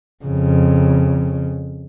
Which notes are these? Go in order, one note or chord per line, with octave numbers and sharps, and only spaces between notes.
F2 C#3